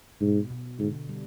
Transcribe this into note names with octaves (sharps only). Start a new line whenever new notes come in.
G#2 B2
B2
G#2 D3
G3